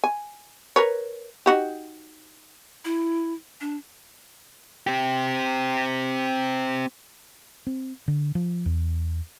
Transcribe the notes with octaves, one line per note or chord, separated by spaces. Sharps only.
G#5
A#4 B4 C#5
D#4 F#4 G4
E4
D4
C4 G4
C4
D3
F3
E2